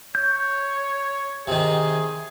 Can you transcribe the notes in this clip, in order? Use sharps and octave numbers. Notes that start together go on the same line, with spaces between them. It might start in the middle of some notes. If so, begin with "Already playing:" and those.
C#5 G6
C3 D#3 G#4